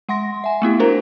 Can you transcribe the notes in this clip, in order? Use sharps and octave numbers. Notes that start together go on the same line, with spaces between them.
G#3 F#5 C6 A#6
E5 G#5
A3 B3 E4 G4
D4 E4 F#4 A#4 C5 A#5